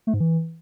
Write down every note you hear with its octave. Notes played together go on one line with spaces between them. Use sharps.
A3
G#2
E3